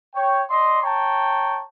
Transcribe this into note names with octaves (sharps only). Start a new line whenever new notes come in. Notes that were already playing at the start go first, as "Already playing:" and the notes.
C#5 G5
D5 D#5 C6
C#5 G5 A5 A#5